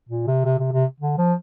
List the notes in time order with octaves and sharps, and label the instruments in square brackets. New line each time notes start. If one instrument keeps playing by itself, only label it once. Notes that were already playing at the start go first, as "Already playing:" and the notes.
[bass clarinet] A#2
C3
C3
C3
C3
D3
F3